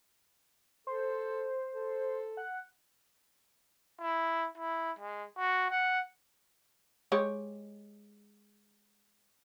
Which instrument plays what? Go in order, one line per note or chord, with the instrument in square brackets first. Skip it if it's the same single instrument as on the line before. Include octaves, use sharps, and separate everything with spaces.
[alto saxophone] A4 [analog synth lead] C5
[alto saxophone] A4
[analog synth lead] F#5
[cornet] E4
E4
G#3
F#4
F#5
[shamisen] G#3 G4 C#5